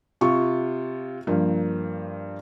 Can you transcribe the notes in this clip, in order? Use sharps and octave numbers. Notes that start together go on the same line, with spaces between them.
C3 F4 C#6
G2 F3 A#3